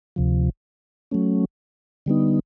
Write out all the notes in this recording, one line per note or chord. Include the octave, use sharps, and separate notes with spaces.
D2 C3 F3
F#3 A3 C#4
D3 G3 B3 D#4